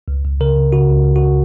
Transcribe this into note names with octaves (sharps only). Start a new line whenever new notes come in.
C#2
C#2
C#3 A#4
C#3
C#3 F#4
C#2
C#2
F#4